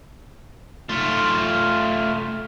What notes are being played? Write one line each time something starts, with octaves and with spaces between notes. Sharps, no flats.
A3 F4